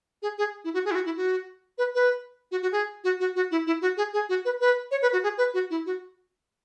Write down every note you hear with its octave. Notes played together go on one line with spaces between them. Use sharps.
G#4
G#4
E4
F#4
G#4
E4
F#4
E4
F#4
B4
B4
F#4
F#4
G#4
F#4
F#4
F#4
E4
E4
F#4
G#4
G#4
F#4
B4
B4
C#5
B4
F#4
G#4
B4
F#4
E4
F#4